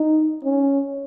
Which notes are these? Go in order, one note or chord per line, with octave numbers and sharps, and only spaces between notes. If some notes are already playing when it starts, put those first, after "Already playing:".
Already playing: D#4
C#4